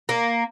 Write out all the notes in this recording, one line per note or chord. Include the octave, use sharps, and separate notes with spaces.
A#3